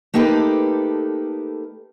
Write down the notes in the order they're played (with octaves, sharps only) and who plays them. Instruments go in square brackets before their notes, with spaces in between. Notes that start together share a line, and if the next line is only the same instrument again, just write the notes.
[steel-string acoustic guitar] A3 A#3 D#4 G4 A4 B4